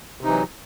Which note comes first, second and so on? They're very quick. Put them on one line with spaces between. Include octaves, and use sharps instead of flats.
C3 D#4 E3 F#3